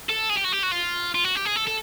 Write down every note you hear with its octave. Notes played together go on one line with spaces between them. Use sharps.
A4
G#4
G4
F#4
G4
F#4
F4
F4
F#4
G4
G#4
A4
A4